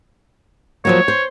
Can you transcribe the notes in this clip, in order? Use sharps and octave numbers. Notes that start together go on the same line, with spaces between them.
F3 F#3 A#3 C#5
C5